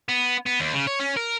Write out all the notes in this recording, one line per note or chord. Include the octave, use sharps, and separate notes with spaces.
B3
B3
D#2
C#3
C#5
C#4
A#4